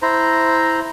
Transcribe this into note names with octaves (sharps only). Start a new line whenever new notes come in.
E4 C5 A#5